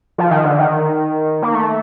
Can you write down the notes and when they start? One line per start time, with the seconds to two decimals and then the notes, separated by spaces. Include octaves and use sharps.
0.18 F3
0.31 D#3
0.45 D3
0.59 D#3
1.42 A#3
1.54 A3